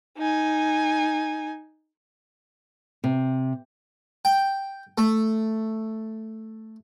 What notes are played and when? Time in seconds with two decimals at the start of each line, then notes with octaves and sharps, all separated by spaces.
0.18 D#4 G#5
3.04 C3
4.25 G5
4.98 A3